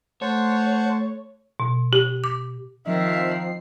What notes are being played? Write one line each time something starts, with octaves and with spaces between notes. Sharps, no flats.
A3 C5 C#5 F#5 A5
B2
G4
D6
D#3 F3 C4 E5 C7